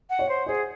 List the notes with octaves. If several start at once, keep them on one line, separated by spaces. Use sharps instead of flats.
F#5
C#5
C5
G#4 C5